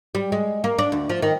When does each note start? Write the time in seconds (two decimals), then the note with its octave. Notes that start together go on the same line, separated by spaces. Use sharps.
0.15 G3
0.32 G#3
0.64 A#3
0.79 D4
0.92 D2
1.10 F3
1.22 D#3